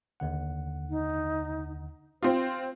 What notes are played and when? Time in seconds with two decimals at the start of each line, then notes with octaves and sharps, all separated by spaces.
0.20 D#2 D3 F#5
0.90 D#4
2.23 C4 F4 C5